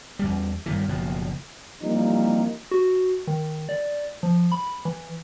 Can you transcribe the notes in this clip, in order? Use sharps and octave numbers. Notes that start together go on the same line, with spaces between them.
E2 G3
G2 D#3 E3
F#1 B2 F3
E3 F3 G3 A#3 C4 D#4
F#4
D#3
D5
F3
B5
E3